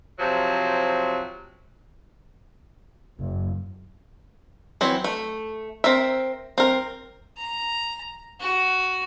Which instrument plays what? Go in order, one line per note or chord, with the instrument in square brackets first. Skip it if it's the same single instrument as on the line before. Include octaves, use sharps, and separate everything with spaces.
[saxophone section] C3 F3 F#3
[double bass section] F#1
[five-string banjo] E3 F#3 C4
A3
C4 A#4 E5
C4 A#4
[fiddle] A#5
F#4